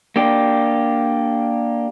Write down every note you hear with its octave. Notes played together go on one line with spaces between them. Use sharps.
A#3 D4 G4